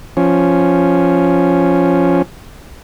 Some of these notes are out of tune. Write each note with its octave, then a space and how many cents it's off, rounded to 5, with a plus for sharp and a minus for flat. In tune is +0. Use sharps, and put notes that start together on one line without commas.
F3 +0 C#4 +0